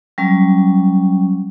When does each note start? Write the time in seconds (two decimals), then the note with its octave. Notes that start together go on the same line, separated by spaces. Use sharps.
0.18 F#3 G3 C#4